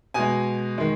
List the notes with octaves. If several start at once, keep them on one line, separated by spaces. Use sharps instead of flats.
B2 G#3 G#5
D#3 G#3